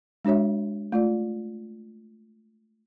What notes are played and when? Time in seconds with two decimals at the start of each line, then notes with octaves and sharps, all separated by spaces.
0.25 G#3 D4 F#4 C#5 E5
0.92 A3 F4 D5